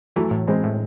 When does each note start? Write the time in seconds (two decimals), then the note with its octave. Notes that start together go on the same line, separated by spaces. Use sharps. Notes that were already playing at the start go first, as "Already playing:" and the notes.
0.16 E3 F#3 A3
0.31 A2
0.47 E3 G#3 C4
0.63 A2